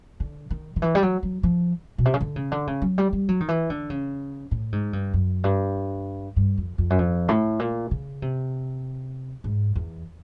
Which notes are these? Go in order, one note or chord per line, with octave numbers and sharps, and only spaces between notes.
D3
D#3
D#3
E3
G3
F#3
F#3
F3
B2
C3
C#3
D3
C#3
D3
C#3
F#3
G3
G3
F#3
D#3
E3
D3
C#3
A2
G#2
G2
F#2
G2
G2
F2
F2
F#2
F2
A2
A#2
C#3
C3
G#2
E2